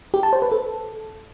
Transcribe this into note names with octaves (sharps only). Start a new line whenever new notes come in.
G4
A5
C5
B4
A4